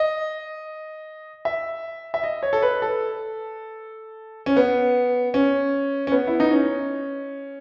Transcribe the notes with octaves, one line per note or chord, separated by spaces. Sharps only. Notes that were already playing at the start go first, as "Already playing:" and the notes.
Already playing: D#5
E5
E5
D#5
C#5
A4
B4
A4
C#4
B3
C#4
C#4
B3
E4
D#4
C#4